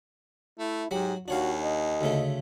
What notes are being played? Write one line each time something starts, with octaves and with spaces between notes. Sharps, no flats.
A3 E4
G#2 F#3 F#4 G4
D#2 D4 F#4 C#5 F5
D#5
D2 C#3 A3